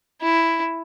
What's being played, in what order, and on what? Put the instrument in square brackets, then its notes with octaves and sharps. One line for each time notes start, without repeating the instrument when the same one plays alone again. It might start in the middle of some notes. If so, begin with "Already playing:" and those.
[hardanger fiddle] E4